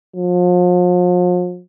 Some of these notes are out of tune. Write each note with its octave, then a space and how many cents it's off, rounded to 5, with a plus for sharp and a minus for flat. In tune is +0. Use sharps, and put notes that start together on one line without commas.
F3 +40